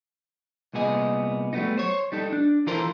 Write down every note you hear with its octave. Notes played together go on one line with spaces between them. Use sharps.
C2 A#2 B3 G#4 D#5
F#3 G3 A3 B3 D#4
C5 C#5
G3 D#4 A4
D4
E3 F4 A4 A#4 C5